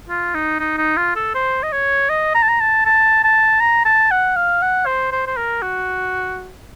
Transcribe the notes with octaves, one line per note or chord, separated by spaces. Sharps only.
F4
D#4
D#4
D#4
F4
A4
C5
D#5
C#5
D#5
A#5
A5
A#5
A5
A5
A5
A#5
A5
F#5
F5
F#5
C5
C5
C5
A#4
F#4